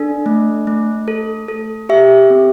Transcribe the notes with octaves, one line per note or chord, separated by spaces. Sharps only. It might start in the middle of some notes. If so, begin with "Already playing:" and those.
Already playing: D4 A4
A3
A3
A4
A4
G4 E5
C4